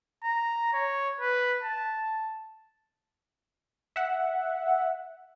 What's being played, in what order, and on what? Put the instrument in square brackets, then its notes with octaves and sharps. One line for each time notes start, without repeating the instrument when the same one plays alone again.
[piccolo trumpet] A#5
C#5
B4
A5
[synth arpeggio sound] E5 F#5